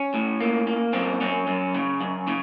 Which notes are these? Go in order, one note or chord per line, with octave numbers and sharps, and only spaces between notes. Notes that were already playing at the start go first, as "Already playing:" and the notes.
Already playing: C#4
A2
A#3
A#3
F#2 C4
F#2 C#4
F#2
C#3
F#2
C#3